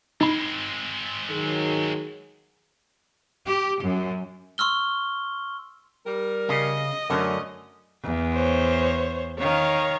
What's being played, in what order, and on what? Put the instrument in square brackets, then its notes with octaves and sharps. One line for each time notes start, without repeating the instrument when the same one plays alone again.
[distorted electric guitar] G#3 C4 [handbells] D#4 B5
[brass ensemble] D#3 F#3 G#4
[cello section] G4
F#2
[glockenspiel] C6 C#6 E6 F6 G7
[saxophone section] G3 A#4
[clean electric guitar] C#3 [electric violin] D#5
[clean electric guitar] F#2 [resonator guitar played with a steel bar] D3 C#4 [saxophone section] A3 A#4
[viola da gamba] E2
[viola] C5 C#5
[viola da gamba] D#3 [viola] C#5 F5